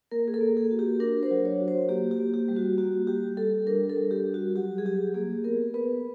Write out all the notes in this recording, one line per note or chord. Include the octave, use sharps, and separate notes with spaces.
A#3 A#4
G#4
A4
A#3
G#4
F#4
G4
D4 A#4
C5
F#3
C#5
F#4
C5
A#3 G4
G4
A#3
G4
G3
F#4
A#3 F#4
G3 G4
G3 A4
D4 A#4
A4
G3
G4
G3
F#4
F#3 G4
G#4
F#3 G4
A#3 G#4
B3 A#4
B3 B4